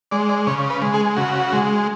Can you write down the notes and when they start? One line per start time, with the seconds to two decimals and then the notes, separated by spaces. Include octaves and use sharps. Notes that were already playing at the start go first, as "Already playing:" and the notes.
0.11 G#3 D5
0.29 D5
0.47 C#3 C#5
0.70 B4
0.82 G#3
0.94 G#4
1.17 C#3 F#4
1.52 G#3